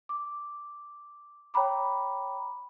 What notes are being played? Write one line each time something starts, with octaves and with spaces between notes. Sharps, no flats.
D6
C#5 G5 A#5 B5 D6